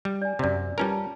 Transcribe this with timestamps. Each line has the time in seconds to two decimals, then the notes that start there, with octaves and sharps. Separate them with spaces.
0.05 G3
0.22 D5 G#5
0.39 F#2 C3 D5 F#5
0.78 G3 C#4 F4 A#4 B4 A5
0.92 A5